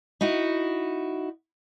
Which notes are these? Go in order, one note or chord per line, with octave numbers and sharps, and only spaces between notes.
D#4 E4 F#4